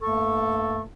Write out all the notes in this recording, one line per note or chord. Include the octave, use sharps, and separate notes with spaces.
G2 A3 A#3 A4 A5 C#6